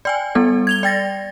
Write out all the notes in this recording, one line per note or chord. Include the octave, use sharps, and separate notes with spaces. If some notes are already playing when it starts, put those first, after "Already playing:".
D5 G5 G#5
G3 B3 A4
G#6 F7 G7
D5 G5 A6 A#6